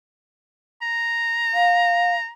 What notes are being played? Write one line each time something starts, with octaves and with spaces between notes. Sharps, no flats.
A#5
F5